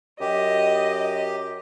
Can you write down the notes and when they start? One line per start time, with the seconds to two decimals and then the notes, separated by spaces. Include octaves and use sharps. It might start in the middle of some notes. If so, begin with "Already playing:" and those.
0.20 F#2 G4 D#5